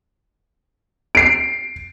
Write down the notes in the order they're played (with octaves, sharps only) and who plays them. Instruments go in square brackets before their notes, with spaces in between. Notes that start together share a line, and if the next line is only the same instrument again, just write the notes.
[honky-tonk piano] C7 D7